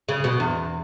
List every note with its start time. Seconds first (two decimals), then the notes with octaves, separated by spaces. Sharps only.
0.09 C#3
0.24 B2
0.40 E2